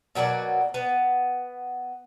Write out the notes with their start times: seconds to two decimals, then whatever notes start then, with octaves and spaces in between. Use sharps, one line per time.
0.15 B2 F#3 A#3 D5
0.74 B3